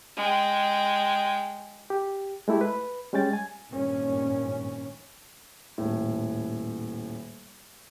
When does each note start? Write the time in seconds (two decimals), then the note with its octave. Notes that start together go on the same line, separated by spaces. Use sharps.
0.16 G#3 G5
1.90 G4
2.48 G#3 A3 E4 G4
2.61 B4
3.13 G3 G#3 C#4 G5 A6
3.33 G#5
3.70 G#1 G2 A#2 C#4
5.78 D#1 A2